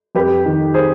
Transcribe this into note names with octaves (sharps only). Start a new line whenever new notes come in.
F2 G4 B4
D#3
G#4 C5